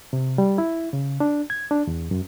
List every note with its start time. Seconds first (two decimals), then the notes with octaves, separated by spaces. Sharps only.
0.13 C3
0.38 G3
0.58 E4
0.93 C#3
1.20 D4
1.50 G#6
1.71 D4
1.87 E2
2.11 F#2